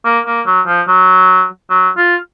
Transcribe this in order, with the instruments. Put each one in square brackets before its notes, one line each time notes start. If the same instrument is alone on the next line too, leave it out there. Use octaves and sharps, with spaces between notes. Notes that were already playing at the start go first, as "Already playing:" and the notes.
[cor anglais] A#3
A#3
F#3
F3
F#3
F#3
F4